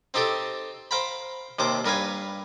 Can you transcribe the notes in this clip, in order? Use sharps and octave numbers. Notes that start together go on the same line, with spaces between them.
C4 D#4 G4 A4 G5
C5 F5 G5 A#5 B5
D#2 C3 C5 D6
G2 A#4 B4 F5 G#5